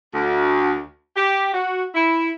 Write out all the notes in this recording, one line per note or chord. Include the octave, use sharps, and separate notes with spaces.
D2
G4
F#4
E4